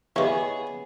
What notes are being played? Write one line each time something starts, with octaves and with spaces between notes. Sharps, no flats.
E3 B3 G4 G#4 C#5 D#5 F5